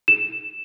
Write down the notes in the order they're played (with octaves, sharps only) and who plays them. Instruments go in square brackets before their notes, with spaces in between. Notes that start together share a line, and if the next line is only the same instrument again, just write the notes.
[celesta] E7